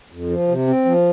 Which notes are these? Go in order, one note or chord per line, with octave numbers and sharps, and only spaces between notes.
F2
F3
C3
C4
F3